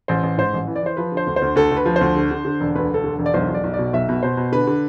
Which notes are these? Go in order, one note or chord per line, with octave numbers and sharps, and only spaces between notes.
A1 C5
A1
G#2 C5
A1
E3
D5
E3 C5
F3 B4
D3
C5
D2
C5
D2
D2 A4
D2
B4
F3
C5
D2
D3
D3
D3
E1
D2 B4
E1 A4
D3
E1
D5
B1 C5
B1
D5
B1
B2 D5
B1 E5
B2
B2 C5
B2
D3 B4
D3